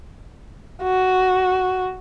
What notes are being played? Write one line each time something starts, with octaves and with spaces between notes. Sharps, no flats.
F#4